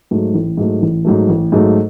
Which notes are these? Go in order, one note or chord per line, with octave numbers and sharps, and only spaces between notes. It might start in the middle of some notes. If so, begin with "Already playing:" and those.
G#2 F#3 A3
A1
G#2 F#3 A3
A1
G#2 F#3 A3
A1
G#2 F#3 A3